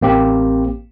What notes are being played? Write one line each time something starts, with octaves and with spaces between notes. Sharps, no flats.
A1 A#3 C4 G4